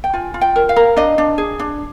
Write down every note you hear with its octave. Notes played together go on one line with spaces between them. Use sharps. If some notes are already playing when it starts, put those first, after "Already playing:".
G5
F4 G#5
F4
G5
A#4
F5
A#4
D4 D#5
D4
G#4
D4